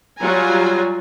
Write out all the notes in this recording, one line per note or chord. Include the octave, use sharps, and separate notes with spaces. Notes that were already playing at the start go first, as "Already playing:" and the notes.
F#3 G3 F4 G#5 A#5